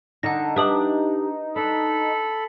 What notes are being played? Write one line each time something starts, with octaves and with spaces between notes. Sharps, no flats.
D3 D4 D#4 F#5 A#6
D4 G4 B4 E5 D#6 F#7
D4 A4 B5